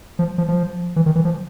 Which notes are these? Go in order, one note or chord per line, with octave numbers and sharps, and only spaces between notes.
F3
F3
F3
E3
D#3
E3
F3